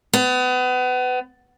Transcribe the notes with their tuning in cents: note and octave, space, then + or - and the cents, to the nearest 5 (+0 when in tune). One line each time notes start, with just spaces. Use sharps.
B3 +30